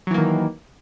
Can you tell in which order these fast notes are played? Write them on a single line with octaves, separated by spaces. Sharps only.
F#3 E3 A#3 D#3